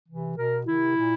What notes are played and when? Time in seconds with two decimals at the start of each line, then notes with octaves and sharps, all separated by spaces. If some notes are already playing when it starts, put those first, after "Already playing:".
0.08 C3 E3
0.38 B2 A#4
0.67 C3 D#3 E4
0.96 A#2